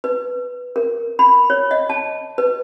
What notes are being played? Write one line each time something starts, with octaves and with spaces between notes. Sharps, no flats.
B4
A#4
B5
C#5
D#5
A5
B4